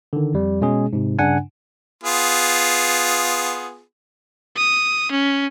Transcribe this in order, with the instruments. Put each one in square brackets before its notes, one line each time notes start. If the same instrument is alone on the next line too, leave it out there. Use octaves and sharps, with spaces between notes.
[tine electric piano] D3 D#3
F2 G3
B2 G#3 C#4 G#4
G#2 C3
G2 C#3 D4 F#5 G#5
[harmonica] B3 F4 G#4
[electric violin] D#6
C#4